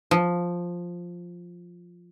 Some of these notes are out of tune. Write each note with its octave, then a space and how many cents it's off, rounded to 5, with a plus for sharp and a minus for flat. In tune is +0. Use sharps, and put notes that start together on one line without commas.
F3 +5